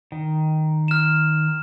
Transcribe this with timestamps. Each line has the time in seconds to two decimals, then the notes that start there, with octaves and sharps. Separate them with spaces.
0.12 D#3
0.88 F6 E7